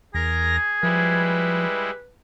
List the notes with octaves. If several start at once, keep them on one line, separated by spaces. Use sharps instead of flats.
E2 G#4 A#4 A#5 A#6
F3 G3 G#3 E4 B4